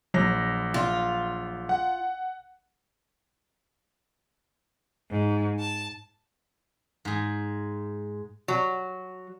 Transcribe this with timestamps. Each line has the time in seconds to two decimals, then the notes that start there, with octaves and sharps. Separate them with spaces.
0.14 A#1 F#3 A#6
0.74 F4
1.69 F#5
5.11 G#2
5.59 A5
7.05 G#2 G#4
8.48 F#3